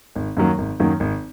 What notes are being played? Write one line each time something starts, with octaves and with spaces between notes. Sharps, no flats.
G#1
F#2 D#3 F#3 A#3
G#1
F#2 D#3 F#3 A#3
G#1